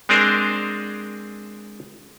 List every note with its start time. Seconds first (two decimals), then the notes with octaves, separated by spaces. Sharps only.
0.09 G#3 C4 D4 G#4 A#4 C5